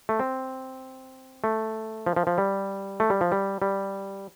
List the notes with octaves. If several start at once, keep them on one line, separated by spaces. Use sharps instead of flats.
A3
C4
A3
F3
F3
F3
G3
A3
G3
F3
G3
G3